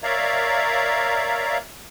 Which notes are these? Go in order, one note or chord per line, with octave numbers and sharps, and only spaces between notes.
A#4 C#5 D5 E5 F5 A#5